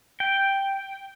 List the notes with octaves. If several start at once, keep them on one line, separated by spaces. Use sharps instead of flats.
G5